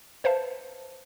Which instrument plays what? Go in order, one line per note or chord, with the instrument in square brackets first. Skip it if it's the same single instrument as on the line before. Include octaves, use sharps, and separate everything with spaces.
[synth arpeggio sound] B4 C5 E5 F5 A5